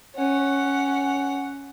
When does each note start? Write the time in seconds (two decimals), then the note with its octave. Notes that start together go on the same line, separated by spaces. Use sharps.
0.16 C#4 F#5